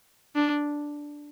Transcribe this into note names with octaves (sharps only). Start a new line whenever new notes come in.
D4